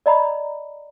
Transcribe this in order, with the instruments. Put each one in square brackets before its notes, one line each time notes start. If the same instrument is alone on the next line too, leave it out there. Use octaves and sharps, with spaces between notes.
[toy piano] D5 D#5 A#5 B5